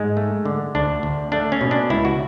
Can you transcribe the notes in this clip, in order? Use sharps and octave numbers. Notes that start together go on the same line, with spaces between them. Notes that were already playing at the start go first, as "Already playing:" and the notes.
Already playing: G#2 G#3
A3
D3
D2 D4
D2
A3 D4
C#4
B2
D4
C#2 E4
F#4